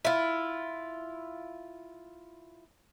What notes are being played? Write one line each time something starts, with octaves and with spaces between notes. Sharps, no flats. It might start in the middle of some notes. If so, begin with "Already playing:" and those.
E4 F4